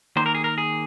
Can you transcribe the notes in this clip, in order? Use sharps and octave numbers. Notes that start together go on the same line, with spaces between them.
D#3 A#3 C5
A#4
G#4
A#4
G#4